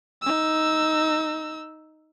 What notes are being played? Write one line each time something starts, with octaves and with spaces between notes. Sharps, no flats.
D#4 E6